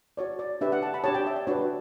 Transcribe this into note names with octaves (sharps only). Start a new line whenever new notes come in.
F#4 C#5 D5
D5
D4 G4 B4 E5
F#5
A5
B5
D4 G4 C#5 A5
G5
E5
D5
D4 F#4 B4 C#5